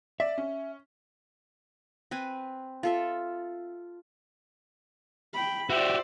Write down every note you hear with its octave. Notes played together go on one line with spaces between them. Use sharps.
D5 E5
C#4
C4 B4 G#5
F4 A4 E5
G5 B5
F#4 G4 C5 D5 E5